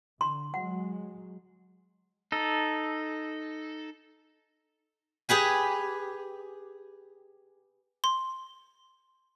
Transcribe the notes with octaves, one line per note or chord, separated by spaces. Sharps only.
D3 C6
F#3 G#3 F#5
D#4 A4
G4 G#4 B4 G#5
C6